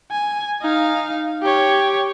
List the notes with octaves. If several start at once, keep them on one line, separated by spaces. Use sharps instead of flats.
G#5
D#4 F5
G4 C#5